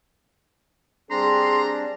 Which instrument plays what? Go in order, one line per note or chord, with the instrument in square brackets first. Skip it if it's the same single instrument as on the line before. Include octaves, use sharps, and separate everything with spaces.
[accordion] G3 C4 D4 [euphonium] G#4 [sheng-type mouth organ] A#5 [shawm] C6